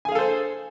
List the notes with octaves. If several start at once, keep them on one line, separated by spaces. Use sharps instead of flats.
G#4 A4 C5 F5 G#5